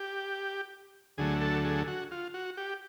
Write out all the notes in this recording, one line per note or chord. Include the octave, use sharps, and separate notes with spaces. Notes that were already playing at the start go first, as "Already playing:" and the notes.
Already playing: G4
D2 D3 F#3 A3 G#4
A4
G#4
F#4
F4
F#4
G4